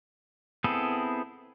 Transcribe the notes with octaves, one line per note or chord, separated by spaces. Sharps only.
B3 C4 E4 G#4 A4